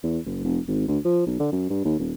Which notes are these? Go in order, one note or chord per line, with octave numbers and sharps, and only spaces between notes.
E2
F#1
F1
G#1
D2
F3
B1
D3
F#2
G2
D#2
D#1